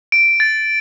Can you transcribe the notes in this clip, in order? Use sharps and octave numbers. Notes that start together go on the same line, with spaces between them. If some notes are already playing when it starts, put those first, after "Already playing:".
D7
A6